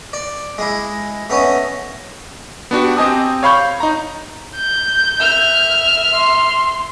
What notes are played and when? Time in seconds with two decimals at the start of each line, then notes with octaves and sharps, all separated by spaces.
0.13 D5
0.58 G#3 E4
1.30 A3 B3 C#4 D#5
2.71 B3 D4 F#4 G4
2.97 C4 G4 D#5 G#5 A5 D#6
3.43 C#5 F5 B5 C#6 G6
3.80 D#4 A#5
4.57 G6
5.20 E5 F6
6.15 C6